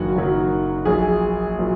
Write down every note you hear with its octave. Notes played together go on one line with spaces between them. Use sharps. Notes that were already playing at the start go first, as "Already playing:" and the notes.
Already playing: F#1 F#2 D#3 F#3 F#4
F#1 F#2 D#3 F#3
A#1 A#2 F#3 G#4
A#2 F#3